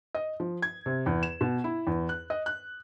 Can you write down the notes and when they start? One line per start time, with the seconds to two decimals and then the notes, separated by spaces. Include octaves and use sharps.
0.15 D#5
0.40 F3
0.62 G#6
0.86 C3
1.06 E2
1.23 E7
1.41 B2
1.64 E4
1.87 E2
2.09 F#6
2.30 D#5
2.46 F#6